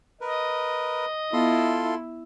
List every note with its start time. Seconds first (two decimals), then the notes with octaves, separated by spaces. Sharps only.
0.21 A#4 B4 D#5
1.33 B3 E4 F4 A4 C6